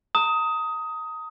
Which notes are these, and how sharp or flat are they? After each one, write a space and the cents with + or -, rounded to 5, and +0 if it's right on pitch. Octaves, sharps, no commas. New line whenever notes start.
A#5 -30 D#6 +15